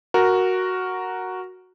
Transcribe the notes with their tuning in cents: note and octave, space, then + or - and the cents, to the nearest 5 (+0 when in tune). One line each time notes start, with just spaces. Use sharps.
F#4 +0 A#4 +0